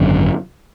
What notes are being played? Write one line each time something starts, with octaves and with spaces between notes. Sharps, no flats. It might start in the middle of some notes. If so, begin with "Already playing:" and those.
Already playing: G#1 F#2 D3